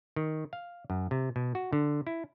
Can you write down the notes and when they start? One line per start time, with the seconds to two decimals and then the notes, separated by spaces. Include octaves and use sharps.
0.16 D#3
0.53 F5
0.90 F#2
1.11 C3
1.36 B2
1.55 F#4
1.73 D3
2.07 E4